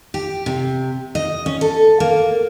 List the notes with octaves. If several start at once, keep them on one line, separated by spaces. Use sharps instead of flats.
G4
C3
D#5
C#4
A4
A#3